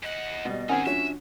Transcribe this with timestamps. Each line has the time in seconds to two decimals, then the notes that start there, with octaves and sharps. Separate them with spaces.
0.03 E2 D#5 F#5
0.45 B2 G3
0.69 D#3 C4 C#4 D#4 G#4 F#5 G#5
0.86 F3 D4 F#4 C#5 E5